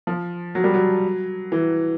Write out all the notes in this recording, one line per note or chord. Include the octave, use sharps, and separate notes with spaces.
F3
F#3
G3
F#3
E3